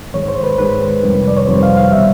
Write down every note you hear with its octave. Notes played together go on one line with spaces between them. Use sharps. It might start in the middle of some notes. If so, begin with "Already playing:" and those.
G#2 D#3 G#3 C#5
C5
B4
G#2 D#3 G#3 B4
F2 C3 D#3 G3
D5
C#5
F2 C3 D#3 G3 C5
F5
F5
B2 G3 E5